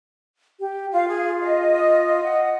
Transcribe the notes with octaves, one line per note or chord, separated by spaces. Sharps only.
G4
F4 F5
G#4
D#5
F#5